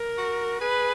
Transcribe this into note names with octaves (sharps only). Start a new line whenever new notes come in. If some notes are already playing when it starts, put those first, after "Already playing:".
Already playing: A#4
F#4
G#4 B4